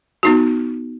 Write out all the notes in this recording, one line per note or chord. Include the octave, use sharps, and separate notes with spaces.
B3 D#4 F#4